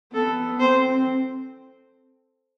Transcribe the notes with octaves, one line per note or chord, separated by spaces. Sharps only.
B3 A4
C4 C5